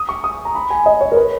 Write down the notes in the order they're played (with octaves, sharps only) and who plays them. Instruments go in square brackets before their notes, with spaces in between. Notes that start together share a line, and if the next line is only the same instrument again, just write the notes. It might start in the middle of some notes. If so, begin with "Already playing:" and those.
Already playing: [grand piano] D#6
C#6
D#6
A#5
B5
G#5
D#5
C#5
A#4
B4